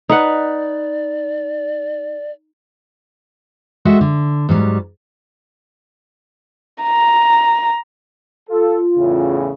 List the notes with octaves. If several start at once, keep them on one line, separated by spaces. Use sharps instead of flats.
D#4 B4 D5 F#5
G#3 F#4 A4 E5 F#5 G5
D3
G#2 F#3 G3
A#5
F4 A4
E2 A2 C#3